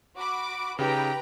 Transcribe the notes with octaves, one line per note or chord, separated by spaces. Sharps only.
F#4 B5 D6
C#3 D#4 G4 B4 G5 A#5